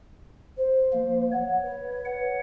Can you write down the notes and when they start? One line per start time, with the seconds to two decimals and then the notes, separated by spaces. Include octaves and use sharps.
0.56 C5
0.93 F3 A#3
1.32 C#5 F#5
1.63 B4
2.05 C#5 F#5